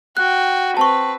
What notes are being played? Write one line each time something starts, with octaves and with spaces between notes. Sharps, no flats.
F#4 G5 F#6
C4 B4 A5 C#6